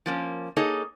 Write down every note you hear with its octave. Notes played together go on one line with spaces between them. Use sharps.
F3 A#3 C#4
A#3 D#4 G#4 A4 C#5 D#5